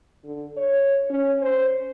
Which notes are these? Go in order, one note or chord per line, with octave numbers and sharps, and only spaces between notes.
D3
C#5
C#4
C5